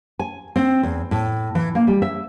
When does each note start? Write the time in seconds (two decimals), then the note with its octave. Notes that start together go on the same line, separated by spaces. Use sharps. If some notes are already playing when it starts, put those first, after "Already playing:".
0.19 G#5
0.56 C4
0.83 E2
1.11 A2
1.55 E3
1.75 A#3
1.87 G3
2.02 E5